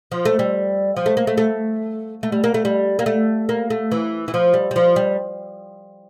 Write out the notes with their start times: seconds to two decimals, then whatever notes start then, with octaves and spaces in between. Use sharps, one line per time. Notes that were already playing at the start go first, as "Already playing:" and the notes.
0.11 F3
0.25 A3
0.39 G3
0.97 F3
1.06 A3
1.17 A#3
1.27 A3
1.38 A3
2.23 A3
2.32 G3
2.44 A#3
2.54 A3
2.65 G3
2.99 A#3
3.06 A3
3.49 A#3
3.70 A3
3.92 E3
4.28 E3
4.34 F3
4.54 G3
4.71 G3
4.76 F3
4.96 G3